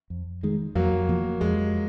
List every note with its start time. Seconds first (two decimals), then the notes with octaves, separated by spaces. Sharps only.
0.10 F2
0.43 D#3 G#3
0.75 F2 F#3 A#3
1.09 F3 A#3
1.41 F2 G#3